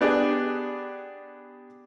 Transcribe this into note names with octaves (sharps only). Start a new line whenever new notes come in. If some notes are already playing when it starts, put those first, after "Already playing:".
B3 D4 G4 G#4